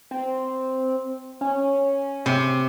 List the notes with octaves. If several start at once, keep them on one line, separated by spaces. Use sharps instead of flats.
C4
C#4
C3